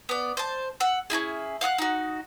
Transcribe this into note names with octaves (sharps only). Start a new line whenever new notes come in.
B3 D5
C5 A5
F#5 E6
C#4 D#4 E4 G#4
F5 F#5 D#6 F#6
D#4 F#4